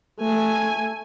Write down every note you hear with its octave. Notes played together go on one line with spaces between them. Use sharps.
A3 G#5